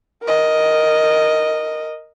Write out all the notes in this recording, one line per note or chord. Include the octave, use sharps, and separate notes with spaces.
A#4 D#5